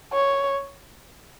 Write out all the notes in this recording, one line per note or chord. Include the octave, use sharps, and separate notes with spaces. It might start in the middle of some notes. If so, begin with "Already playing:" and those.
C#5